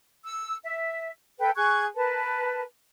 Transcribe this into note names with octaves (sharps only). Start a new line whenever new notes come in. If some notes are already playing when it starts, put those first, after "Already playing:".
E6
E5
A4 B4 G5
G#4 C#6 F#6 G#6
A#4 B4 A5